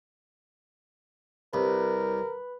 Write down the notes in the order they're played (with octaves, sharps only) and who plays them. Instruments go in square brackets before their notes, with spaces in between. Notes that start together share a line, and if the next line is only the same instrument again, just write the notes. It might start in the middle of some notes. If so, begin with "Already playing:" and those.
[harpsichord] C2 [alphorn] A#4 [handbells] B4 B5